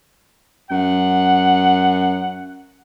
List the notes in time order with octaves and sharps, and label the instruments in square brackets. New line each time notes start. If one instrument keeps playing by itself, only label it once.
[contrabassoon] F#2 [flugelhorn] F#5